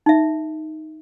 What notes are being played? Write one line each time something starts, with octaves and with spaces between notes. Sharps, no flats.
D#4 E5